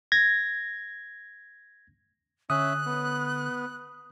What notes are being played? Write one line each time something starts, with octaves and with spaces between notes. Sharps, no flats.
G#6 A#6
D3 C#4 E5 D#6 F#6
B3